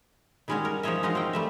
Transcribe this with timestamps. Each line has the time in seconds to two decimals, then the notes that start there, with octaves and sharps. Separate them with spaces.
0.48 D#3 G3 G#3 C#4 F#4 C#5
0.65 A#4
0.83 F3 D#4 G#4 C#5 D#5 E5
1.03 F3 G#3 D#4 F#4 D#5 F5
1.15 C4 C#4 G5
1.33 G3 A3 E5